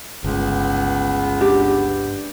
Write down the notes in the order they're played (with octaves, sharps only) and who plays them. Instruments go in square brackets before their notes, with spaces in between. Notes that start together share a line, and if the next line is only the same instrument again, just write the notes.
[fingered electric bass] G1 [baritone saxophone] C#2 [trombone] B3
[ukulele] D4 G4